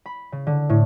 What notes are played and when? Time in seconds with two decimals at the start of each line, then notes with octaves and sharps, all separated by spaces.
0.06 B5
0.32 C#3
0.47 D3
0.69 A2